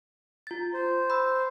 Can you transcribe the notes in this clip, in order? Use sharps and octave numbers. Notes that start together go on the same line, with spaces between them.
F4 A6
C5
B5 E6